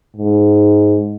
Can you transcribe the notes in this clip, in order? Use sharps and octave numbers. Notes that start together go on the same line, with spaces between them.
G#2